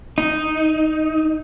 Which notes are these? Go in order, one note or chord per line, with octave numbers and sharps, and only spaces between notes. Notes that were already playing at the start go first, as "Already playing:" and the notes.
D#4